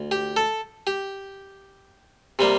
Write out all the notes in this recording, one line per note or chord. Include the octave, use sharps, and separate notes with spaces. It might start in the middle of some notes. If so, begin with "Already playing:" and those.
Already playing: D2
G4
A4
G4
C3 G3 A#3